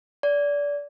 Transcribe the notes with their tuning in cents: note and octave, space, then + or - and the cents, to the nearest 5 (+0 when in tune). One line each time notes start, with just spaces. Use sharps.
D5 -25